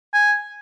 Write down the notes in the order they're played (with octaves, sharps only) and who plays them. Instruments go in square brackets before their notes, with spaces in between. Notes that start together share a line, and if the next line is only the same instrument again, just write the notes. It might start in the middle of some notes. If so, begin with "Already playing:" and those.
[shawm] G#5